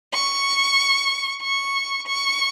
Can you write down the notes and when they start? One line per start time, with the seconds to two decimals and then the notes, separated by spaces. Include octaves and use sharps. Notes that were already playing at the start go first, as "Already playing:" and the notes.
0.14 C#6
1.42 C#6
2.07 C#6